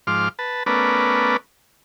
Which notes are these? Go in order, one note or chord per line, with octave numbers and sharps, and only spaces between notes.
G#2 F3 C6 D6 F6
B4 A5
A3 B3 C#4 A#4 B4 D5